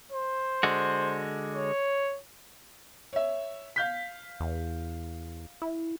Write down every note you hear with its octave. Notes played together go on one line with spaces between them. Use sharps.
C5
D3 G#3 F#4
C#5
C#5 E5
F5 G6 B6
E2
E4